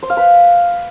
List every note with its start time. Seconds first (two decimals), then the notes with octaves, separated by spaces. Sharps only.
0.03 C5
0.10 F5
0.17 B4